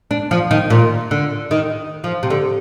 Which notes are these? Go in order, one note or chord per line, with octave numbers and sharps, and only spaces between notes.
D4
F3
D#3
A#2
D3
D#3
F3
C3
D3